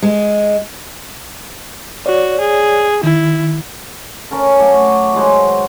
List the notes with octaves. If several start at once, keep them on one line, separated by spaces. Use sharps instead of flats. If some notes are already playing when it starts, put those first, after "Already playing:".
G#3
F#4 C#5 D5
G#4
D#3 E4
C#4 A4 A#4 C#5
F#3 A3 C#5 D6
D#3 F#3 G#3 C5